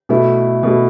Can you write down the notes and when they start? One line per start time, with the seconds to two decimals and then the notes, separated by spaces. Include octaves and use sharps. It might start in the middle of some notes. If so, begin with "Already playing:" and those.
0.09 B2 A3 E4
0.63 B2 A3 E4